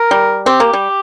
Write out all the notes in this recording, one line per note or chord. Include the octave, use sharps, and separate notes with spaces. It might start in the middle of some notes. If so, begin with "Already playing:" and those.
Already playing: A#4
G3
C4 G4
A#3
G3